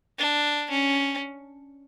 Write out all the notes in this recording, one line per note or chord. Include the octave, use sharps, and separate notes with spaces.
D4
C#4